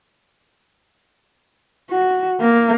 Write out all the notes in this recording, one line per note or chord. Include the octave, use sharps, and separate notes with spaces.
F#4
A#3